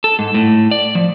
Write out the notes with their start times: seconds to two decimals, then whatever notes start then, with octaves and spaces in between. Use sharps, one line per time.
0.04 A4
0.19 G#2
0.34 A2
0.71 D5
0.95 F3